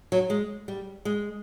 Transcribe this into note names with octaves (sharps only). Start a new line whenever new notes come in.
F#3
G#3
G3
G#3